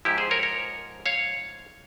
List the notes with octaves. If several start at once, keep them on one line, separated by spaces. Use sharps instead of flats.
G#2 F3 E4 G4
G#4 C5
A#4 C#5
A#4 C#5
C#5 F5